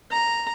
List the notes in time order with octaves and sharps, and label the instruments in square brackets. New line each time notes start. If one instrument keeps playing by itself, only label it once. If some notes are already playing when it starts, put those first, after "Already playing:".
[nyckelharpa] A#5